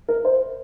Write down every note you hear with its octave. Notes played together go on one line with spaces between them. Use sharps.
A#4
C5